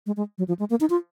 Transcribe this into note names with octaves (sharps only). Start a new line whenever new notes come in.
G#3
G#3
F#3
F3
G#3
A#3
D#4
F4